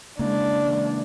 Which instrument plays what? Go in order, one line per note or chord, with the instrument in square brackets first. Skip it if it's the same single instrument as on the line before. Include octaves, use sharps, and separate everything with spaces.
[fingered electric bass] C#3 A#3 [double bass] G#3 [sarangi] D4
[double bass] E3 G#3